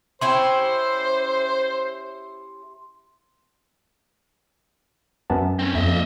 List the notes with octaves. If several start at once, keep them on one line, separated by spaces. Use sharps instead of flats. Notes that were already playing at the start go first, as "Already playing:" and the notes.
C#4 E4 G4 C5 C6
F#2 B3 A5
C4 C#4
F2 A#3 D#5 E5